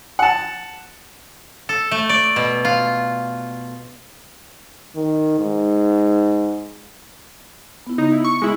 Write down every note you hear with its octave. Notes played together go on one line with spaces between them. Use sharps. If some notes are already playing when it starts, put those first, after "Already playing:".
F#5 A5
A4
A3
D5
B2
F4
D#3
G#2
B3 E4
C#3 D#4
E4
C#6
G#3 E4